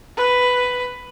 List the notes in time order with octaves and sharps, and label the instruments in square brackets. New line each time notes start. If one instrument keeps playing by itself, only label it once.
[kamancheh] B4